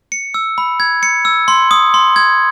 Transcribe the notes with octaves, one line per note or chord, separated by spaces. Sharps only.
C#7
E6
B5
G#6
C#7
E6
C6
D#6
C6
G#6